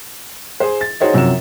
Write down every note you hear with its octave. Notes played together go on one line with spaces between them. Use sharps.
G#4 C5
A6
D#4 F#4 G#4 C5 C#5 D#5
F#2 C3 F3 F#4 C#5 E7